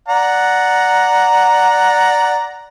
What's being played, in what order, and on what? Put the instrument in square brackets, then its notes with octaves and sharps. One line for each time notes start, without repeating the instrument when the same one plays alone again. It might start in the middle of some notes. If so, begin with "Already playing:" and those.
[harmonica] D5 F#5 A#5